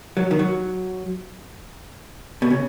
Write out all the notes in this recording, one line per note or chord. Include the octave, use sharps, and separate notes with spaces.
F#3
D#3
F#3
B2
C#3